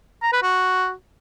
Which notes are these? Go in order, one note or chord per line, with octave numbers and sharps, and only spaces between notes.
A#5
B4
F#4